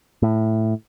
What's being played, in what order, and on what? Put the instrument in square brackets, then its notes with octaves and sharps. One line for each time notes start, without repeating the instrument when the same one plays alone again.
[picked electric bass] A2